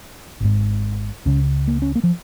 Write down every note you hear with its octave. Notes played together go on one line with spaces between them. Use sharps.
G#1 G#2
C#2 C#3 C#4
A#3
C#4
A#3
F3